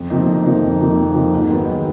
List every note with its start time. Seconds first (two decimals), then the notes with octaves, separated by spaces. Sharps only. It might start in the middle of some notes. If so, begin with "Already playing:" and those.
Already playing: F2
0.10 C3 F3 A#3 D#4
0.26 F2
0.45 C3 F3 A#3 D#4
0.62 F2
0.79 C3 F3 A#3 D#4
0.96 F2
1.14 C3 F3 A#3 D#4
1.32 G#2
1.49 D#3 F#3 B3
1.66 G#2